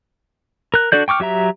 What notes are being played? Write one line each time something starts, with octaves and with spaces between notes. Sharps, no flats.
A#4 F#6
D4 F#4 A4 D5 G6
G5 C#6 D6 F6
F#3 G4 E5 A#5